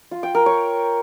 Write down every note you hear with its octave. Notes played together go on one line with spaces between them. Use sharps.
F4
G5
A#4
C#5